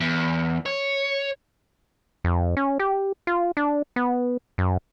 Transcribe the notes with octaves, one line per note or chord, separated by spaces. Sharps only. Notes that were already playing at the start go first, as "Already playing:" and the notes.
E2
C#5
F2
C#4
G4
F4
D4
B3
F#2